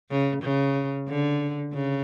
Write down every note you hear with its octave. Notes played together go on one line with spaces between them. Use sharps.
C#3
C#3
D3
C#3